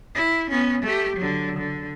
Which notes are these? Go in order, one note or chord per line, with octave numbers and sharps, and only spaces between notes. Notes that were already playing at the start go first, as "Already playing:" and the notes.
E4
B3 C#4
A3 G4
D3 F#3
D3